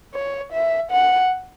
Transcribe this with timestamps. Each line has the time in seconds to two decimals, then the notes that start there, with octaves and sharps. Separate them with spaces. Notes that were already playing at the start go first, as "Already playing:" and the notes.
0.14 C#5
0.53 E5
0.91 F#5